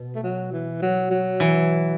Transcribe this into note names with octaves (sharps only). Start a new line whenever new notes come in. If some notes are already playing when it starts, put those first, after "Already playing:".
Already playing: B2
A3
F#3
E3
F#3
F#3
E3